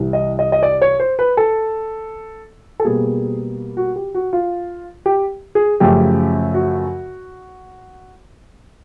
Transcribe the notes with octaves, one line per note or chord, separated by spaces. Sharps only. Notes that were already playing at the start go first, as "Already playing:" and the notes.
Already playing: C2 C3 E3
D#5
D#5
D#5
D5
C#5
C5
B4
A4
A4
B2 G3 A#3 G#4
F#4
G4
F#4
F4
G4
G#4
F#2 C#3 F3 A3 G4
F#4